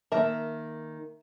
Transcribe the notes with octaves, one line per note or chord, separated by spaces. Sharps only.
D#3 A#3 A#4 E5 A5